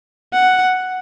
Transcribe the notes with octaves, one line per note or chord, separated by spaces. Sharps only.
F#5